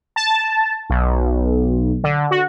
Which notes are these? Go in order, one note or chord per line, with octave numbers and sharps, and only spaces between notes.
A5
B1
D3
F#4